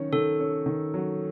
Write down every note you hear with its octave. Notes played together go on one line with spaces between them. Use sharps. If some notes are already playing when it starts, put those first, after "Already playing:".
Already playing: D#3 F#3 C#4
D#3 A4
C#4
D#3
F#3